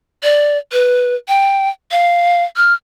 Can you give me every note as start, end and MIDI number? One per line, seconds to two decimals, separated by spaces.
0.23 0.58 74
0.72 1.15 71
1.28 1.69 79
1.91 2.44 77
2.57 2.74 89